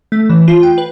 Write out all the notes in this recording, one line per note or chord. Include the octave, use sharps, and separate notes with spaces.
A3
E3
F4
G5
B4